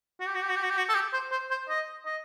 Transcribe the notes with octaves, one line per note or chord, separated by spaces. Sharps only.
F#4
G4
F#4
G4
F#4
G4
F#4
G4
F#4
A4
G4
C5
C5
C5
D#5
D#5